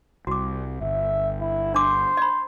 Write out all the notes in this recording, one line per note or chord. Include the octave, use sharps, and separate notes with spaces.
C2 F#4 D6
G1 E5
E4
D4 C5 D6
D#5 B5